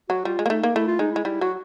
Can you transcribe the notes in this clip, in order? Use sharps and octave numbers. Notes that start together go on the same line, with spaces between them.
F#3 F#4
G3 F4
G#3
A#3
A3 D#4
A#3
A3 E4
F4
G#3 D#4
E4
G#3
G3 E4
F#3 F#4